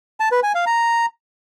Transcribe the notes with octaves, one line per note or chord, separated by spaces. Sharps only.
A5
B4
G#5
F5
A#5